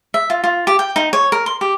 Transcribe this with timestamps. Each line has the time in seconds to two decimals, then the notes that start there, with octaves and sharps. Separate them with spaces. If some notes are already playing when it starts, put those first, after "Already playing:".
0.14 E5
0.30 F4
0.44 F4
0.67 G4
0.79 G5
0.96 D#4
1.13 C#5
1.32 A#4
1.46 C6
1.61 G4